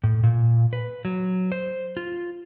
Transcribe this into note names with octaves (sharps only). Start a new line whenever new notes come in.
A2
A#2
B4
F#3
C5
F4